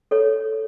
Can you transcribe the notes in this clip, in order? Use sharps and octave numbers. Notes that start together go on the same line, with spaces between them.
A4 C#5